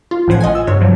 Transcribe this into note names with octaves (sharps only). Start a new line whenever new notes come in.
F4
A1 A2 F3 F#5 G#6
F4 D#5 F#5 G#5
E6
G2 C3 C#5
G2 F3 F#3